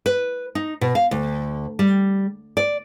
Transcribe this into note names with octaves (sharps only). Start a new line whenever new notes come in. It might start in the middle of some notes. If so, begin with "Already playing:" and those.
B4
D#4
B2
F5
D2
G3
D5